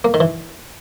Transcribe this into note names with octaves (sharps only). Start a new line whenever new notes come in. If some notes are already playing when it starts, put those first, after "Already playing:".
A#3
D#3
E3